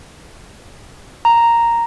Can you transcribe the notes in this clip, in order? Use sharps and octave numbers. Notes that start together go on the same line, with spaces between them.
A#5